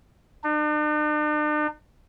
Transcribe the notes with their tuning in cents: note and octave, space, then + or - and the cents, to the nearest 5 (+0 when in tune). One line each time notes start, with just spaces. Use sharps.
D4 +45